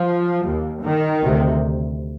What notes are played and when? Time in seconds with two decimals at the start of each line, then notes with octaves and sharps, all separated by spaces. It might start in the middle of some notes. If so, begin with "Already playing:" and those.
Already playing: F3
0.45 D#2
0.84 D#3
1.23 D2 C3